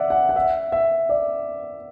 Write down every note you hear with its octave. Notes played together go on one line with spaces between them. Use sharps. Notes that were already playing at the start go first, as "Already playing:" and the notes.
Already playing: D5 E5 F#5
F#5
F#5
E5
E5
D5